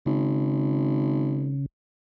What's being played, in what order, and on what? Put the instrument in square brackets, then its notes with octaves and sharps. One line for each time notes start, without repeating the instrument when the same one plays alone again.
[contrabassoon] G#1 [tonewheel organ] C#3